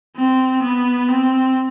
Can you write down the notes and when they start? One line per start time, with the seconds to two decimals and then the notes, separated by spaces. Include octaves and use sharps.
0.16 C4
0.62 B3
1.09 C4